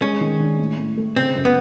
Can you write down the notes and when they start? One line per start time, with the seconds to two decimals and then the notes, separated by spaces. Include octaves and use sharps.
0.01 G#3 C#4
0.21 D#3
0.40 D4
0.59 A2
0.78 A2
0.97 A3
1.16 C#3 C4
1.35 F#2
1.45 B3